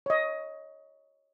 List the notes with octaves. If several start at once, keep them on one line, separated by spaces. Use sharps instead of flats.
C#5 D#5